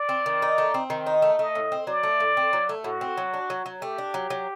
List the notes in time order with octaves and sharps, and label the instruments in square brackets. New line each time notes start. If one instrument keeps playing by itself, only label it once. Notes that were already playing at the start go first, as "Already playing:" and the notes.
Already playing: [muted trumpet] D5
[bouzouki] C4
D#3
D#4
A3
C4
D#3
D#4
A3
[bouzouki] A3 [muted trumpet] D#5
[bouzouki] A2
C4
[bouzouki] F#3 [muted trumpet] D5
[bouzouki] A3
A2
C4
F#3
A3
[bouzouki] A2 [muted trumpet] F#4
[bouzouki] C4
F#3
D4
F#3
F#3
[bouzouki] A3 [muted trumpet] G4
[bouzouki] D4
F#3
F#3